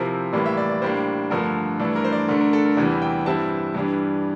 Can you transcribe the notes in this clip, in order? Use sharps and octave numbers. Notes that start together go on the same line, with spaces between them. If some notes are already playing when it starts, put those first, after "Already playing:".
Already playing: C3 F3 C4 E4 A#4
A2 E3 G3 A#3 D5
E5
D5
D5
A2 G3 A#3 D4 C5
G2 D3 F3 A3 A#4
G2 E3 A3 D4 A4
A#4
C5
D5
D3 A3 D4 A#4
A#4
A4
A#4
E2 C3 E3 G3 D5
G5
G2 E3 G3 C4 E4 A5
G2 E3 G3 D4